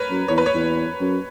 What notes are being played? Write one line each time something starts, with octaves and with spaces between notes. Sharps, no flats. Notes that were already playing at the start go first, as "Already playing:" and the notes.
Already playing: A#4 B4 C#5
F#2
E2 C#5
B4
C#5
E2
F#2